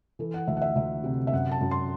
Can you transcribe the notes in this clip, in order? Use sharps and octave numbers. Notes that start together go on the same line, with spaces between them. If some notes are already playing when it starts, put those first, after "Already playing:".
E3 A4
F#5
D2 E5
F#5
E5
D2 E5
C3
E5
F#2 F#5
A5
F#2
C6